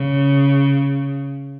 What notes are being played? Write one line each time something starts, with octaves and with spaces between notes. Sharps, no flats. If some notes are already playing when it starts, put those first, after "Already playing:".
Already playing: C#3